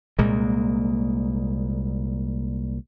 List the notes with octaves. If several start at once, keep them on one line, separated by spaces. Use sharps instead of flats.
C2 A#2 G#3 A#3